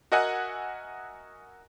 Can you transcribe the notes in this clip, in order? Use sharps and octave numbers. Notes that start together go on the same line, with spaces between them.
F#4 A#4 D#5 E5 F#5 G#5